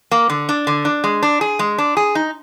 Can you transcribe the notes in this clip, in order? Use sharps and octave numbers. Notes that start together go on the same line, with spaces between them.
A#3
D3
D4
D3
D4
G#3
D4
G#4
G#3
D4
G#4
D#4